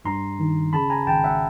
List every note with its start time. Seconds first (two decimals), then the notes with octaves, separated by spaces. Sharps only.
0.05 G2 A#5 C6
0.39 D#3
0.73 C#3 A5 B5
0.90 G#5 A#5
1.07 G#1 G5 A5
1.24 E5 F#5